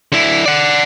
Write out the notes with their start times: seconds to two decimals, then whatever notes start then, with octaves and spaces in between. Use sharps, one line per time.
0.12 D3 E4
0.46 D5 F#5